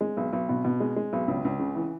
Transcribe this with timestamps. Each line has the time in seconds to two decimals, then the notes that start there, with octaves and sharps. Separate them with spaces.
0.01 G#3
0.17 B1
0.33 B1
0.49 B2
0.64 B2
0.80 G#3
0.96 G#3
1.13 B1
1.28 C#2
1.45 C#2
1.59 C#3
1.75 E3